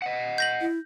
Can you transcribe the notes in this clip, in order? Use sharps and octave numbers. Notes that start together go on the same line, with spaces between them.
D#5 F#5
G6 A#6 F#7
E4